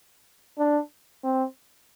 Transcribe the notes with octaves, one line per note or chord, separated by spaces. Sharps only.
D4
C4